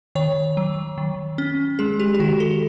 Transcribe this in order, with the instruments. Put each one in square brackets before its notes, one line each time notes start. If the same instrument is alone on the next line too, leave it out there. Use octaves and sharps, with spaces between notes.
[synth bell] D#3 C#5
F#3
D#3
C#4
G#3 G#4
G4
G4
D#3 F#4
A4